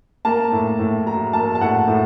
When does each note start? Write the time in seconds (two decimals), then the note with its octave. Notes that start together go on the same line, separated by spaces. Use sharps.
0.25 A#3 A5
0.52 A2
0.79 A2
1.06 F#3 A#5
1.33 A#3 A5
1.55 A5
1.61 A2 F#5
1.88 A2